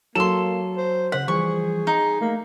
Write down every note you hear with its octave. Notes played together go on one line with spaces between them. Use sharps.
F#3 A#3 A4 C6 E7
C5
C#3 C5 F#5 B6
E3 F3 G3 G#4 C#6
D#4
A3 A#3